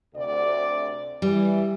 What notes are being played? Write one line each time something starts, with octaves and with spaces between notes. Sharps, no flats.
D2 C3 D5
E3 G3